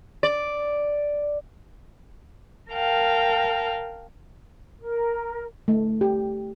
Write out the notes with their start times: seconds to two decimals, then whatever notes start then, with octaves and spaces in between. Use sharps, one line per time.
0.23 D5
2.71 A#4 F5 G5 A5
4.81 A#4
5.68 A3
6.01 G4